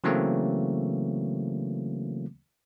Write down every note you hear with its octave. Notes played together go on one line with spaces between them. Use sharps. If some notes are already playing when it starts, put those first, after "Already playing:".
C#3 E3 F#3 A3 A#3 C4